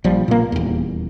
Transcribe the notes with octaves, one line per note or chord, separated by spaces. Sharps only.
A#1 F3 G3
A#2 A#3
D#1 E2